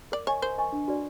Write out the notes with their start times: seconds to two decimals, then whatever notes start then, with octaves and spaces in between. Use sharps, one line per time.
0.12 A#4 D5
0.27 C#5 D#5 G#5 C#6
0.42 A#4 C5
0.58 D#5 G#5 C#6
0.72 D4
0.88 F#4 B4 D5